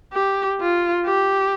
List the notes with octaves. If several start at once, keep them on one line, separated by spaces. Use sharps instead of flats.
G4
F4
G4